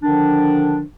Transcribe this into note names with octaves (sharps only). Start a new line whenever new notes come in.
D3 D#3 F3 D4